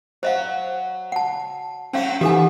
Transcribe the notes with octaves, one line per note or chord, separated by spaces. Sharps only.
F#3 C5 D#5 F5
F#5 A5
F#3 A3 C4 C#4 F5
G#2 E3 D#4 G4 A4 E5 G#5